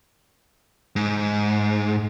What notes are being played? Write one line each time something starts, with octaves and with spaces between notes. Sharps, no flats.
G#2